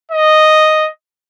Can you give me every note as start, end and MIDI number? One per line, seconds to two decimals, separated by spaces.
0.11 0.90 75